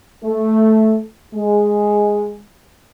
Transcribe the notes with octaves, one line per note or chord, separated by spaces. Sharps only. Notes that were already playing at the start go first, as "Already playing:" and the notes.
A3
G#3